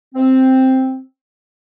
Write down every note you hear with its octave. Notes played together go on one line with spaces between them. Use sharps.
C4